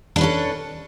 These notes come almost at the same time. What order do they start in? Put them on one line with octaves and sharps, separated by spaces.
D4 B4 C#4 A4